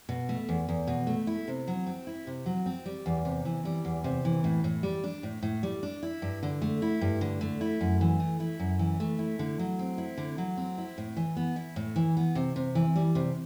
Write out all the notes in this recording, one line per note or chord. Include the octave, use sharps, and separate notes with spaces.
B2
A3
E2
E2
B2
A3
E4
C3
F#3
C4
E4
C3
F#3
C4
G3
E2
C3
E3
G3
E2
C3
E3
A2
A2
G3
D4
A2
A2
G3
D4
E4
G2
D3
A3
E4
G2
D3
A3
E4
F#2
E3
A3
E4
F#2
E3
A3
E4
D3
F#3
C4
E4
D3
F#3
C4
E4
A2
E3
B3
E4
A2
E3
B3
C3
C3
E3
G3
C3